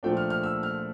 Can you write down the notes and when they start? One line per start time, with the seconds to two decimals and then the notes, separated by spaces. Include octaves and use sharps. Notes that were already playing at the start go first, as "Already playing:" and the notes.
0.03 A#2 F3 A3 D4 G5
0.17 F6
0.30 F6
0.43 E6
0.63 F6